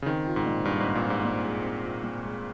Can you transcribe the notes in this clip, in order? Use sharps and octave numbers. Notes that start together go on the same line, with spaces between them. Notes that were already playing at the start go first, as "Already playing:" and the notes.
C#3
D#3 C4
F4
G#2
A#2
G2 G#3
G#2 C4
A#2
F4
G#2
A#2
G#3
C4
F4
A#2
G#3